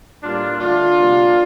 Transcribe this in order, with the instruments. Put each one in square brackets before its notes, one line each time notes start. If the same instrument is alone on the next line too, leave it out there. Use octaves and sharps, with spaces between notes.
[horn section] A2 G3 A#3 D4 F4
D3 A3 D4 F4
C3 G3 A#3